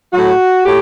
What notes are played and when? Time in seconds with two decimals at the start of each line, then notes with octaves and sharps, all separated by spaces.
0.12 A2 F#3 F#4
0.65 A2 G4